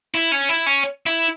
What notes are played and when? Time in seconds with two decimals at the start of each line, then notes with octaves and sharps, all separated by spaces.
0.15 E4
0.32 C#4
0.49 E4
0.66 C#4
1.06 E4